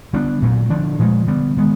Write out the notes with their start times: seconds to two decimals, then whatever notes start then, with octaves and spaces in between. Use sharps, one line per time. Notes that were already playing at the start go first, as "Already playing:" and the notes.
0.13 D3 G3 B3 D4
0.42 A#2 F#3 A3
0.70 D3 F3 A3 D4
0.99 A#2 F3 G#3
1.27 D3 G3 B3
1.57 D#3 G#3 B3